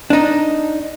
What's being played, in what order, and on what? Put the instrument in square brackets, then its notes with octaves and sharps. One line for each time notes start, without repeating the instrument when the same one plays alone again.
[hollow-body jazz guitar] D4 D#4